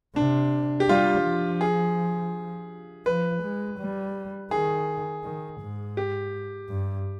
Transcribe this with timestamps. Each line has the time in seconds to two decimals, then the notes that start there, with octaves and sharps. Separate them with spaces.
0.16 C3 D4
0.80 G4
0.89 G3 F4
1.25 F3
1.61 G#4
3.06 F3 B4
3.43 G#3
3.79 G3
4.51 D#3 G#4
5.24 D#3
5.61 G#2
5.97 G4
6.70 G2